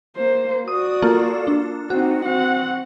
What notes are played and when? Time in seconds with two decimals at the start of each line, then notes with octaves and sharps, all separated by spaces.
0.16 A#3 C5
0.68 F#4 D5 D#6
1.02 A#3 F4 A4
1.47 D4
1.90 C4 D#4 F#4
2.23 C4 F#5